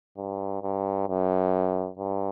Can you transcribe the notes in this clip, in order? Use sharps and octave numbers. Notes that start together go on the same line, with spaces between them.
G2
G2
F#2
G2